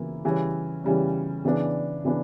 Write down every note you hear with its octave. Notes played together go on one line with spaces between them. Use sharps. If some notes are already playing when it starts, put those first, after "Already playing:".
Already playing: C#3 E3 A#3 E4
C#3 E3 G3 C#4
C#3 E3 G3 C#4
C#3 E3 B3 D4
C#3 E3 B3 D4